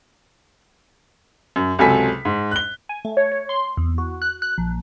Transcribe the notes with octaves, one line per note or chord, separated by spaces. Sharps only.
F#2
C#2 C3 F#3 A4 G#5 B6
G#2
F#6 G7
G#5
A3
C#5
C#5
C6
E2
F#4
F#6
F#6
A#1